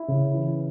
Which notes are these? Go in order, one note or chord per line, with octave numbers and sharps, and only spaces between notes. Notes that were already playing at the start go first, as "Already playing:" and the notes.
Already playing: E4
C#3
E3